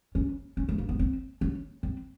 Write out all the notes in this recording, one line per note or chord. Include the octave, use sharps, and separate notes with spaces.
C#4
C#4
A3
A#3
B3
C4
C#4
C4